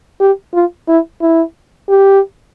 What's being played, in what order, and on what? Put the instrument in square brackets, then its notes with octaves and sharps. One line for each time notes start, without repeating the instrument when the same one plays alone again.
[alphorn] G4
F4
E4
E4
G4